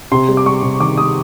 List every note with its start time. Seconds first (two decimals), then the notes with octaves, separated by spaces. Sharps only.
0.12 C3 C6
0.28 G3
0.37 D6
0.45 G3 C#6
0.63 C3
0.80 D#3 D6
0.97 G3 D#6